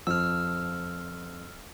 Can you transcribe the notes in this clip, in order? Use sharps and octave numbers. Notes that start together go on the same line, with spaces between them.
F2 F3 E6 F6